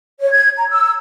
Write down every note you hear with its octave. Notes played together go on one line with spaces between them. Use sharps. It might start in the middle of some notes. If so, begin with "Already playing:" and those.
C#5
G#6
A#5
E6